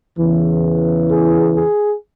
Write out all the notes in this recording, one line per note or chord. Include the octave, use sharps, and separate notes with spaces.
E2 C#3 E3
G#4
G#4